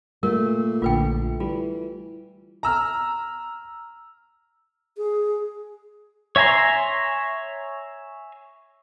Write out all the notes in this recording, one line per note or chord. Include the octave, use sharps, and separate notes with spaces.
A#2 A3 A#4
A#1 D3 F4 B4 G5
E3 G3 F4
A#5 E6 F6
G#4
C#5 E5 G#5 A#5 C6